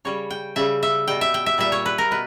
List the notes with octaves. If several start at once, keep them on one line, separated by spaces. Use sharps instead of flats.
C#3 G3 C#5
G5
C#3 G3 E5
E5
B2 G3 G5
E5
G5
E5
A#2 G3 E5
C#5
B4
A#4
B2 B4